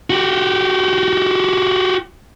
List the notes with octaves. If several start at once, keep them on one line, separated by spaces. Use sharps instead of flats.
F#4 G4